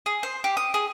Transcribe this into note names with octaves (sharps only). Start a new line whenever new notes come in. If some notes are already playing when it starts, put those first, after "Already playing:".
G#4
C5
G4
D#6
G#4